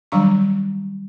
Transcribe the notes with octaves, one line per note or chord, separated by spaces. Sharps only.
D#3 F#3 G3 D4 A#5 C#6